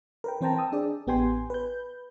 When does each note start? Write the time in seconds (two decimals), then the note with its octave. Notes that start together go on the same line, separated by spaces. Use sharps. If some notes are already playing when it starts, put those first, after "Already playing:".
0.24 A#4 B4 G5
0.41 E3 C4 C5 G5 A5 A#5
0.56 G5 A5 D#6 E6
0.72 D4 G#4 D5
1.07 A1 B3 G4 G5 G#5 C6
1.50 B4 G6